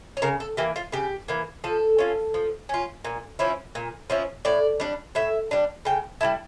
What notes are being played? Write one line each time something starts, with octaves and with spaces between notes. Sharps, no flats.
C#5
C#3 A#4
A4
E3 A#3 G4
F4
C#3 G4
E3 A#3
F3 A4
C#4 F4
F3
C#4 F4
A#2
F3 C#4 E4
A#2
F3 C#4 E4
A2 D5
G3 D4
A2 E5
G3 D4
C#3 G5
G3 C#4 E4 A5